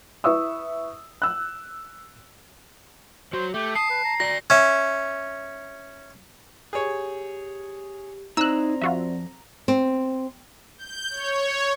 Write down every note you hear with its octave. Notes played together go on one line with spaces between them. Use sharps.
E4 B4 E5 C#6 D#6 E6
E6 F#6
F#3 F#4 C5
A3 G4
A5 D#6 C7
B4
A#5
F#4 D5 A#6
C#4 E5
G4 G#4 C#5
C4 D#4 E4 C5 D5 A#5 E6 F#6
F2 F4 F#4 E5
C4
G6
C#5